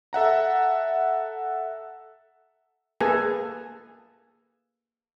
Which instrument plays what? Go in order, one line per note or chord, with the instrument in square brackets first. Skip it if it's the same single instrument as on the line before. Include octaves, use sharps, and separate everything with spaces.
[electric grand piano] A4 E5 F#5 A#5
[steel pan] A#3 G#4 A4 B4 G#5